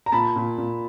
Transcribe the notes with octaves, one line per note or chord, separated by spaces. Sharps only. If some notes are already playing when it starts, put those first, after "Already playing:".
A#5
A#2 A5 B5
A#2
A#2